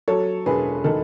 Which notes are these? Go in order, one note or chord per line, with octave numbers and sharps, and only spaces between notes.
F#3 A4 C#5
E1 G#4 B4
D#3 A4